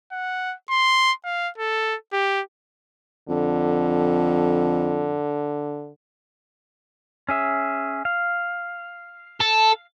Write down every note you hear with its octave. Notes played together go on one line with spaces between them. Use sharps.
F#5
C6
F5
A4
G4
F2 D3
C#4 G#4 E5
F5
A4